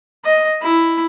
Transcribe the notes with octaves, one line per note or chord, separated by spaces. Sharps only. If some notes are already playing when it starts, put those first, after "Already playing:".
D#5
E4